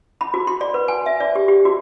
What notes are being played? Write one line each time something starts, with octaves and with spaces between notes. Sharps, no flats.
B5
F#4
C6
D5
B4
G#5
E5
D5
G4
G4
F#4